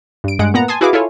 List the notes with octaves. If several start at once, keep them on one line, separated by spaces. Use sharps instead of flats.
G2 D7
G2 G#3 F#5 D7
A#2 B3 F#5 A#5
G#5 A5 C6 D#6
E4 F#4 G#4 B4 F5 D6
E4 F4 A4 C#5 G#5